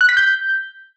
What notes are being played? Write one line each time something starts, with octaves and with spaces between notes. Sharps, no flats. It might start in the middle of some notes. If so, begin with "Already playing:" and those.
F#6
B6
G6